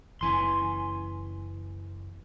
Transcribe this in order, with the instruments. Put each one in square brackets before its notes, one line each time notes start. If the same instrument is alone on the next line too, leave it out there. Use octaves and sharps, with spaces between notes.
[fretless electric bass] F#1 E3 [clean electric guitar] C#4 G#5 C6